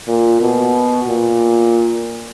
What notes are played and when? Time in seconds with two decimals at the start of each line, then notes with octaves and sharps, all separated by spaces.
0.08 A#2
0.41 B2
1.09 A#2